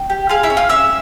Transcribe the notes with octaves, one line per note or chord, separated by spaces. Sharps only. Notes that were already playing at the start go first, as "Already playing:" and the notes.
Already playing: G5
G4
F4 G#4 F5
E4 E5
C#4
F4 F5
C#4 E5 E6